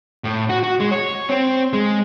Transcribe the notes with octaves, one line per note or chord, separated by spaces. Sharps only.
A2
F#4
F#4
G#3
C#5
C4
G#3